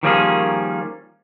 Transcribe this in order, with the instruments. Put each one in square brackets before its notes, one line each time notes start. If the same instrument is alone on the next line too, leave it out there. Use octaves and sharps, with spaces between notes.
[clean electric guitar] D#3 F3 G3 A#3 C#4 G#4